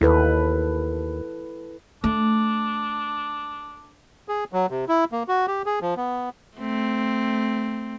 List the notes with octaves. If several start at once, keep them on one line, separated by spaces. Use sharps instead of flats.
D#2 E4 A4 B4
A3 D4
G#4
F#3
C3
E4
A#3
F#4
G4
G#4
F3
B3
A3 C4